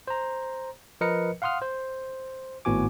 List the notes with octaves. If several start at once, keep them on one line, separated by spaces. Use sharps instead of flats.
C5 A#5
F3 A#4 B4 D#5 C#7
F5 F#5 C6 D#6 F6
C5
G#1 A2 B3 F#4 G#5 D6